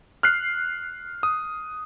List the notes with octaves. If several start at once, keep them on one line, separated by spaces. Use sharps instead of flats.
F6 F#6 C7
D#6